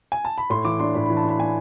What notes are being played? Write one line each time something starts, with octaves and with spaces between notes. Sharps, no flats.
G#5
A5
B5
A2 C6
E3 D6
D4 C6
A2 B5
E3 B5
A5
D4 B5
D4 G#5